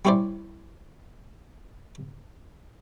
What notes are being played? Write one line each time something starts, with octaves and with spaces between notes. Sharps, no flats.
G3 C#4 E4 C5 D5